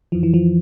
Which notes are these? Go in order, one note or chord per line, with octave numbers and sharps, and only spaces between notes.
F2 E3 F3
E3
F3